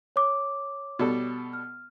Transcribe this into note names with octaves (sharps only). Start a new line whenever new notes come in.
C#5 D6
B2 G3 A4
F6